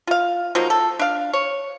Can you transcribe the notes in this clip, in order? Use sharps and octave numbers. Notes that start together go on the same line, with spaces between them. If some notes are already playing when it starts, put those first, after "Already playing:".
F4 F5
F3 F#3 A#3 D#4
A4
D4 F5
C#5